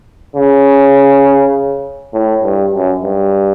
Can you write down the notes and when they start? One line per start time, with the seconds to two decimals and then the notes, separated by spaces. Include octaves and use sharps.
0.36 C#3
2.14 A2
2.43 G2
2.73 F#2
3.03 G2